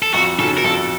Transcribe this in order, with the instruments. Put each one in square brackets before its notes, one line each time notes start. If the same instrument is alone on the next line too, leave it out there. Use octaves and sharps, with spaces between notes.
[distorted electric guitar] A4
[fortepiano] F2 [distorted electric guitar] F#4
[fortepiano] C#3 [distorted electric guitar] A4
[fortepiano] F#3
[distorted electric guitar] A#4
[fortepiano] F2 [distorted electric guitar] A4